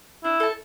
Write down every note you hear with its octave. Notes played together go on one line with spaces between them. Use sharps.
D4 E4
A4 E5 A5